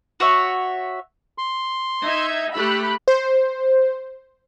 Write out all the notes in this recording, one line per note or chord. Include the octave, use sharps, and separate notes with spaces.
F#4 C#5 E5
C6
D#4 E5 G#6
A3 G4 B5 E6 F#6
C5